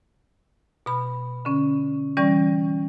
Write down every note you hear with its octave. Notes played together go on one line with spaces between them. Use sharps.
B2 B5
D3 C#4
E3 G3 C#4 D5 C#6